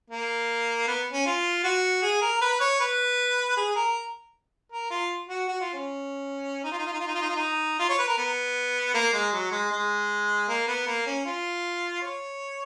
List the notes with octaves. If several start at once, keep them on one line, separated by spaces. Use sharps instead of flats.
A#3
B3
C#4
F4
F#4
G#4
A#4
B4
C#5
B4
G#4
A#4
A#4
F4
F#4
F#4
F4
C#4
D#4
F4
D#4
F4
D#4
F4
D#4
F4
D#4
F4
D#4
F4
C#5
B4
A#4
B3
A#3
G#3
F#3
G#3
G#3
A#3
B3
A#3
C#4
F4
C#5